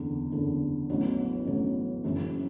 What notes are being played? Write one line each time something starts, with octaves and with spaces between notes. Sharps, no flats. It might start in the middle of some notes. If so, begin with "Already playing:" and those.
Already playing: F#1 E2 D3
F#1 E2 D3
A1 A2 F#3 B3
A1 A2 F#3 B3
F#1 F#2 E3